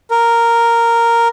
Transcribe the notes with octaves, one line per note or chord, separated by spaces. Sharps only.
A#4